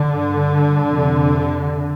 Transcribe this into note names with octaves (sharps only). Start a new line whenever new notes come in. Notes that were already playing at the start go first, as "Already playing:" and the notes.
Already playing: D3
G2
F2 C3